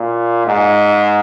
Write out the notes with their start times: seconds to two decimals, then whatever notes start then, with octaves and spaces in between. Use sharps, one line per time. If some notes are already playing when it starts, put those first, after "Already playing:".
Already playing: A#2
0.46 G#2